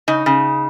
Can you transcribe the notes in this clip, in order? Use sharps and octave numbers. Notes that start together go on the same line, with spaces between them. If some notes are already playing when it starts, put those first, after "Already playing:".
C#3 D#4
C#3